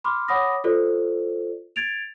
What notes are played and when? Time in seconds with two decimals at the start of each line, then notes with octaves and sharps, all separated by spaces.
0.04 B5 C6 D6 F6
0.28 C#5 F#5 B5 D6 D#6 A#6
0.64 F4 F#4 A4 C5 D5
1.76 G#6 A6 D7 F7